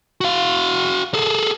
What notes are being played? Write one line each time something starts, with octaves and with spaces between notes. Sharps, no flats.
F#4 F5
G#4 A4